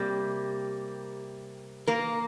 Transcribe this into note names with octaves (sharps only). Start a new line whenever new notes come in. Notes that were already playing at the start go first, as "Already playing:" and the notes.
Already playing: C3 G3 A#3 G4
A#3 A#4